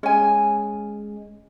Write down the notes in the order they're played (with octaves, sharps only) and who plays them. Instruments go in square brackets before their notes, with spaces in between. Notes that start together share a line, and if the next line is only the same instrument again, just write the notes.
[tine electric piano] G#3 [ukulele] C#4 G#5